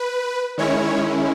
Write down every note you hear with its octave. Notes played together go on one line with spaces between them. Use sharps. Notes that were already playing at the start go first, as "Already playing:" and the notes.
Already playing: B4
D#3 G#3 C#4 E4 C#5